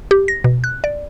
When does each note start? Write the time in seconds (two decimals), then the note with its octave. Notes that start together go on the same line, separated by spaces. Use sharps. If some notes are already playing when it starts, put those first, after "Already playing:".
0.11 G4
0.28 A#6
0.44 B2
0.64 F#6
0.84 D5